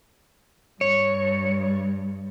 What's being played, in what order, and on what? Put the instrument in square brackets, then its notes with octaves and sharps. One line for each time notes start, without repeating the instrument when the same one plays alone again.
[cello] G2 [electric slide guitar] C#5